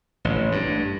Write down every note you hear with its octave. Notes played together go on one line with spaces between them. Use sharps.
A1
G2